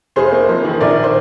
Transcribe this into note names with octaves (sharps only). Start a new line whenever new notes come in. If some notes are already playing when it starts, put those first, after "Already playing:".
F1 G#4 C5
A#3
F2
D#3
A#1 A#4 D5
C5